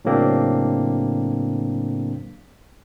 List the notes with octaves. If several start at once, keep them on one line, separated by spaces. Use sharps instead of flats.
A2 C#3 F#3 A#3 C4 D4